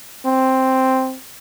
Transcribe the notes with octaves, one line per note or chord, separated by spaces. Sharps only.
C4